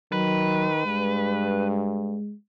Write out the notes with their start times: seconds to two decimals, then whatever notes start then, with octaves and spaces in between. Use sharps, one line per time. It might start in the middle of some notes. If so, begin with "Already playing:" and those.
0.12 D#3 F#3 B4
0.86 G2 G#3